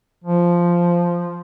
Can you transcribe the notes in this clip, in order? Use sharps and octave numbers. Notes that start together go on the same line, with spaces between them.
F3